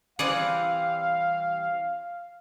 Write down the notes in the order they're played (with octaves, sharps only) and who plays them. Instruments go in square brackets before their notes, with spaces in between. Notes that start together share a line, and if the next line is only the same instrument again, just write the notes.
[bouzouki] E3 G3 C4 [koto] G#4 D5 F#5 [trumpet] F5